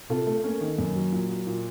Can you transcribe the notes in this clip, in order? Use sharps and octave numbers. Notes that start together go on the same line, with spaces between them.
C3 F4 A4
A3
A3 A#3 C#4
D#3
F#2 A#3
F#3
A#2
F#3
A#2